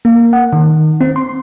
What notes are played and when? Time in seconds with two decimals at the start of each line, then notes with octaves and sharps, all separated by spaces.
0.05 A#3
0.33 F#5
0.53 D#3
1.01 C4
1.16 C6